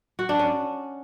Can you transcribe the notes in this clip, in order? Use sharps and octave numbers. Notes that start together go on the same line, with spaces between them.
F#4
D4
C#4